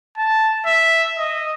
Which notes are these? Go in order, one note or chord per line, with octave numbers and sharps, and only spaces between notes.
A5
E5
D#5